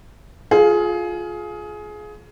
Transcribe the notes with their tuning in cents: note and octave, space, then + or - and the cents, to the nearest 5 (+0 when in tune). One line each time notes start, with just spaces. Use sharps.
F4 +10 G#4 +20 F5 +0